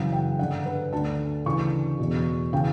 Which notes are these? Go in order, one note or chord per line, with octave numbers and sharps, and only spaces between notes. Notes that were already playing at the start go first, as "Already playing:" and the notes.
Already playing: F#2 C#3 E3 F#5
G5
G2 D3 F#5
B4
D2 D3 A5
D2 C#3 E3 C#6
E2 B2
C#3 E3 G5